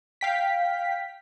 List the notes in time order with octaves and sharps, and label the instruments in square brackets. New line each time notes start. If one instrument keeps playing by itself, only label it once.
[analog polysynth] F5 G5 B6